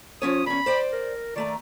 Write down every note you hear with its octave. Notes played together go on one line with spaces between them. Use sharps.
F3 C#4 C#5 D#6
E2 C#4 B5
C5 D5 G5
A#4
D#3 A3 D5 A#5